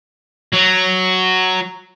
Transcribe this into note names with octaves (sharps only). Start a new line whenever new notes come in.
F#3